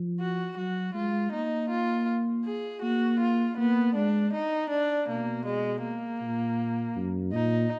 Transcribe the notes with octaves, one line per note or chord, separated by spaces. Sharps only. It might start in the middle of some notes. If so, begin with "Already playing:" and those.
Already playing: F3
F#4
F#3 F#4
G#3 F4
A#3 D#4
F4
G#4
A#3 F#4
F4
A#3 B3
G#3 D4
D#4
D4
B2 A#3
G#3
A#3
A#2
F#2
A#2 D#4